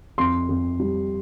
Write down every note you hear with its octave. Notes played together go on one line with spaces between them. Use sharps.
F2 C6
F2
G3